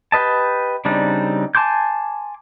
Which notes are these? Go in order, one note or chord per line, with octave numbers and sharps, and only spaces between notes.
G4 B4 D#5 A5
C#3 G3 C4 D4 D#4
G#5 A5 C6 D6 G6